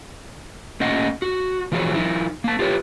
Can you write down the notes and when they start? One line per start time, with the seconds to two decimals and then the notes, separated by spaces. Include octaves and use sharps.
0.80 A3 A#3 C#4 D#5 F#5
1.22 F#4
1.72 E3 F3 F#4 G#4 C#5
1.94 F3 D#4 E4
2.44 A#3 A5
2.59 F4 G4 B4 C#5